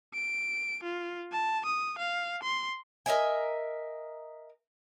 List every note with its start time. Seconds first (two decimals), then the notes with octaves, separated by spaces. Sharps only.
0.14 D7
0.83 F4
1.32 A5
1.65 D#6
1.98 F5
2.43 C6
3.06 A#4 D#5 E5 G#5